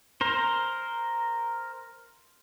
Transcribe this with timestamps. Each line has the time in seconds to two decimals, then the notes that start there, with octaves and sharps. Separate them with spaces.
0.21 A#4 C5